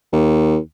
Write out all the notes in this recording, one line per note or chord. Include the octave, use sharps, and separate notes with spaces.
D#2